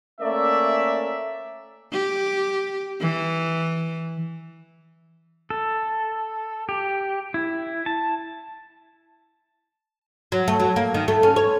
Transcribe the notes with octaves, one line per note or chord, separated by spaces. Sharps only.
A3 A#3 C#4 D5 E5
G4
E3
A4
G4
E4
A5
F#3
A3
F#3
A#3
D#3
A3
C#4
C#5